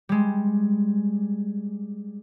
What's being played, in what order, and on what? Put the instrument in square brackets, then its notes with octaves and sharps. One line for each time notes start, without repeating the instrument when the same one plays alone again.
[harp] G3 G#3